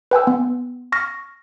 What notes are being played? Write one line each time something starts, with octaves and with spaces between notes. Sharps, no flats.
B4 G5 G#5 E6
B3
C#6 F6 A#6